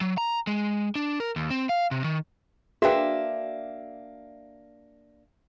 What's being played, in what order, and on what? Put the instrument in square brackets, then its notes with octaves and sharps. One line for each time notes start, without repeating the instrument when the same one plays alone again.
[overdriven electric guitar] F#3
A#5
G#3
D4
A#4
D#2
C4
F5
C3
D#3
[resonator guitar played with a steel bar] A#3 D4 [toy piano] F#4 G5 [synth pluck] G#4 B4 [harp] E5